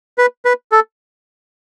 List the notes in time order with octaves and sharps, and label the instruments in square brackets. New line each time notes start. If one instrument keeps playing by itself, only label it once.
[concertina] B4
B4
A4